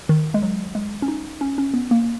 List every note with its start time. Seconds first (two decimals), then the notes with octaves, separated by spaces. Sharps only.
0.09 D#3
0.34 G#3
0.42 F#3
0.75 G#3
1.02 C#4
1.08 D#4
1.41 C#4
1.58 C#4
1.74 B3
1.91 A#3